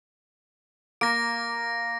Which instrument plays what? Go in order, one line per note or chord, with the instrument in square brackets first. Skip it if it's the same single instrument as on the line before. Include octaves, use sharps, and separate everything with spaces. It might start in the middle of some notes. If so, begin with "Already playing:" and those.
[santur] A#3 [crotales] A#6 D7